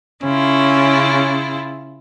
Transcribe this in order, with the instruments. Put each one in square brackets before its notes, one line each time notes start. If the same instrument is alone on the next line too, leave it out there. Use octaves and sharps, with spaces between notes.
[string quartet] C#3 E4 F4 [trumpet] C#4